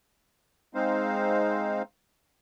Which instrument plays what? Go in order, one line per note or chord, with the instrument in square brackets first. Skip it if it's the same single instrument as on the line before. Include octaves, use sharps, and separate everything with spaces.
[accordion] G#3 C4 D#4 C5 F5